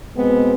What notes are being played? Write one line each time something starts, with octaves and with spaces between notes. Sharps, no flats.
B2 G#3 B3 C4